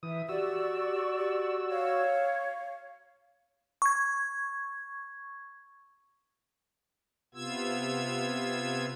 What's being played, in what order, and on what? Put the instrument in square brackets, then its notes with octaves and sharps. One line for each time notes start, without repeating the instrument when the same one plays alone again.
[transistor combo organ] E3 D#6 [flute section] E5
[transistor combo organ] F#4 E6 [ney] G4 [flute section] D5 C#6
[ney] G4
[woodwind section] C#5 [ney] F5
[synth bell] C#6 G#6
[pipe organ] C3 B3 F4 E6 G#6